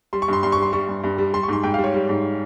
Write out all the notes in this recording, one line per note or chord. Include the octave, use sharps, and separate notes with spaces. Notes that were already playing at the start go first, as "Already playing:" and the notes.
G3 C6
C#6
G2 C6
G2 C6
G3 C#6
C6
G3 C#6
G2
G2
G3
G3 C6
C#6
G#2 C6
G#2 G5
G3 F5
C#5
G3
G#2